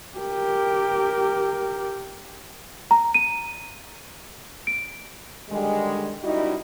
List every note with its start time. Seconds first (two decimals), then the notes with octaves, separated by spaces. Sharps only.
0.19 G4 A#4
2.91 A#5
3.14 D#7
4.67 D7
5.50 D3 D#3 G3 G#3
6.23 F#2 G3 D#4 E4 F#4 D#5